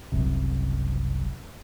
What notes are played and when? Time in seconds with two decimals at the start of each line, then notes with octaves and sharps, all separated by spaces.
0.12 F#1 C2 F#2 C3